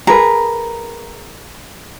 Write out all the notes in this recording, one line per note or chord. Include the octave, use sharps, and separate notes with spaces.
G#4 A#4 B4 A#5